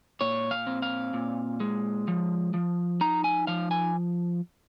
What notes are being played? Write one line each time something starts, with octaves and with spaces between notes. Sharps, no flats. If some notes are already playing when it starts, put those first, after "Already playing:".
A#2 C#5
F5
C4
F5
A#2
G#3
F3
F3
D#4 A#5
G#5
F3 F5
G#5